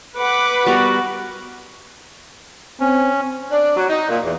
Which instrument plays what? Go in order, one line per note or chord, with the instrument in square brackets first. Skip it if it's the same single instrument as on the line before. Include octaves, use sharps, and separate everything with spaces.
[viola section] B4 [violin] F#5 D6
[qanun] G3 B3 A#4 [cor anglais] F#4
[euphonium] C4 [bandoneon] C#4
[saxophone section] D4
F#3
D#4
A#2
E2